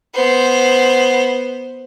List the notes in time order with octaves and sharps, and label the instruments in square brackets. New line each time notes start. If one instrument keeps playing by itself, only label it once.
[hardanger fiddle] B3 C5